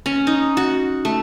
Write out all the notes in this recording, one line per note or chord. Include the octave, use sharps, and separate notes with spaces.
C#4
D#4
F#4
A3